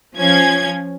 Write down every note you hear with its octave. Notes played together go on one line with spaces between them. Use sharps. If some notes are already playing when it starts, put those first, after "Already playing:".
F3 C#4 G#6